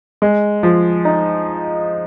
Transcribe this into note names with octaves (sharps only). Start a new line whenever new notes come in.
G#3
F3
D#4